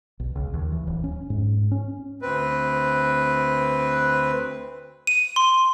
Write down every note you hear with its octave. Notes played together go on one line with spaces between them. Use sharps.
B1
C#2
D#2
E3
D1
C#4
G#2
C#4
D2 C4 B4
D#7
C6